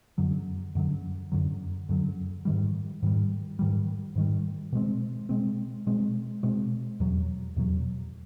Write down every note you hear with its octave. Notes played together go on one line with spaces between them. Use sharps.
F#2 D3 F#3
F#2 D3 F#3
F#2 D3 F#3
F#2 D3 F#3
G#2 D#3 G3
G#2 D#3 G3
G#2 D#3 G3
G#2 D#3 G3
B2 G#3 C4
B2 G#3 C4
B2 G#3 C4
B2 G#3 C4
E2 B2 F#3
E2 B2 F#3